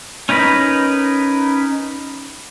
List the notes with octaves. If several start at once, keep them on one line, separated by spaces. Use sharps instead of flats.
C#4 D#4 A#4 B4